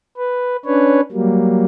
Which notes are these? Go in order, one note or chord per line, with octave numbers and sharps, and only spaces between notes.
B4
C#4 D4 B4 C#5
F#3 G3 A#3